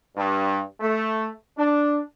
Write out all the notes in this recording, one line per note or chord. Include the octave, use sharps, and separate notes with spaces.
G2
A3
D4